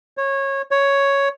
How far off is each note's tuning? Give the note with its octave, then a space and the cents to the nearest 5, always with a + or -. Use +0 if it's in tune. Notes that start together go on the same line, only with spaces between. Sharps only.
C#5 -20
C#5 +5